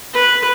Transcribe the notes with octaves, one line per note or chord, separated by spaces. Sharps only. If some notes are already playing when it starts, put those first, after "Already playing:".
B4